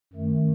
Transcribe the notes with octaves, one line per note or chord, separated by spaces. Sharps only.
F#2 D#3 A3